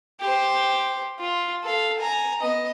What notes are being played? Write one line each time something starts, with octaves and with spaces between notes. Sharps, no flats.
G4 C5
F4
A4 F5
G#5 A#5
B3 D#5